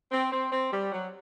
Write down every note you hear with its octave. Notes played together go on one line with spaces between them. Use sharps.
C4
C4
C4
G3
F#3